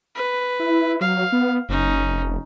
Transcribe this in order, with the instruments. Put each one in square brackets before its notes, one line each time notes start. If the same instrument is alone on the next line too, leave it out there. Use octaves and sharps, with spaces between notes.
[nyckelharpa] B4
[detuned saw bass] E4
[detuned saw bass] F#3 [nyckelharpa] F5
[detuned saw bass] B3
[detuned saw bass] F#1 [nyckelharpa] C#4 D#4
[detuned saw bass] F1